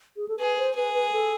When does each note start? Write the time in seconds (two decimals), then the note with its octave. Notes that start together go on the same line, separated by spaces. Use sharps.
0.17 G#4
0.29 A4
0.39 G#4 B4
0.58 C5
0.75 G#4 B4
0.94 B4
1.12 A4